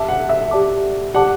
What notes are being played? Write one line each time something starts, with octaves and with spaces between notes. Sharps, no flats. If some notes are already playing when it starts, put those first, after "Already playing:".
Already playing: G4 D5 E5 A5 D6
F#5
E5
G4 D5 A5 D6
G4 D5 F#5 A5 D6